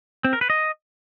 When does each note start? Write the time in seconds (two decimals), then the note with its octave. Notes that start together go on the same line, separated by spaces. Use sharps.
0.25 C4
0.33 A#4
0.41 B4
0.50 D#5